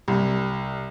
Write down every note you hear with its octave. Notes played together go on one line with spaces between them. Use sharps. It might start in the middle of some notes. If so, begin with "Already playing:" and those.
C2